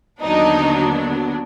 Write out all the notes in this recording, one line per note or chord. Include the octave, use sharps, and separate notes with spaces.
D#2 D3 F#3 B3 D4 D#4